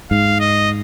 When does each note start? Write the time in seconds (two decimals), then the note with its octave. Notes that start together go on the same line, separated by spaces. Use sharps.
0.11 G#2 F5
0.40 D#5